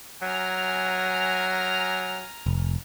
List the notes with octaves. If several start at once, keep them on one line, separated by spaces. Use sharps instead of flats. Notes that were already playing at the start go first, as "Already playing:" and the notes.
F#3 G#5 A#5 F6
F1